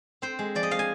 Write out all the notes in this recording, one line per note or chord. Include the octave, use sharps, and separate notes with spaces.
C4 C5
G#3
F3 D5
D#5
F3 F5
G#5